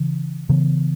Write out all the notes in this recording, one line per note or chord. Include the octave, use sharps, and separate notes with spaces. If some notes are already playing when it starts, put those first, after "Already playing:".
Already playing: C#3 E3
C#3 E3 B3